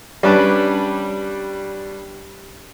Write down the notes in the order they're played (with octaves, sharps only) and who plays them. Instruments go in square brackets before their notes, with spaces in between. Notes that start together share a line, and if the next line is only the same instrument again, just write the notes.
[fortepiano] G3 C#4 D4 B4 A5 D6